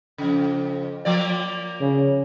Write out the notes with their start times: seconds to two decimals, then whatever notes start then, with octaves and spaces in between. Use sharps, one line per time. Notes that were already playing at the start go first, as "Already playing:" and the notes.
0.18 F2 C#3
1.05 F3 A#3 D5
1.80 C#3